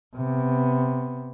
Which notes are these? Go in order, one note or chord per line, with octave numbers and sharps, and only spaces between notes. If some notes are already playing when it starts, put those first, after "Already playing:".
C3 B3